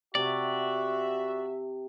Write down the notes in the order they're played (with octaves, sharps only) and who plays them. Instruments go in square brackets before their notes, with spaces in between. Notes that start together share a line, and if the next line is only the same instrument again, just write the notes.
[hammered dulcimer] C3 C#6 [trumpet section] F#4 [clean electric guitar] D5 [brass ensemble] E5